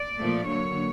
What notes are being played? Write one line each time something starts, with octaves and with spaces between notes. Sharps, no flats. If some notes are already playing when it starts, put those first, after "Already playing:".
Already playing: D5
A#2 F3 A3
D3 F#3 A#3 C#5